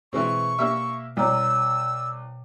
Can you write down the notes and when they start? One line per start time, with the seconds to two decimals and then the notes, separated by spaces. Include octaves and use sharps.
0.13 B2 E3 G#3 C4 C#6
0.59 A#3 G4 E5
1.17 C2 B2 C#5 A#5 E6